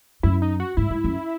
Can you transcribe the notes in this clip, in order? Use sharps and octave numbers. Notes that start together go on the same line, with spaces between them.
F#2 E4
D#4
F#4
G#2 E4
G#2
F#2